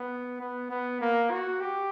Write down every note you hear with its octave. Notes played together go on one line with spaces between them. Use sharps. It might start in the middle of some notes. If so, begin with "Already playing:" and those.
Already playing: B3
B3
B3
A#3
F#4
G4